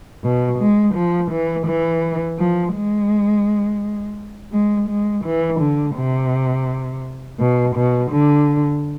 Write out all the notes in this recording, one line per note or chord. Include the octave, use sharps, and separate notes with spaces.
B2
G#3
F3
E3
E3
F3
G#3
G#3
G#3
E3
D3
C3
B2
B2
D3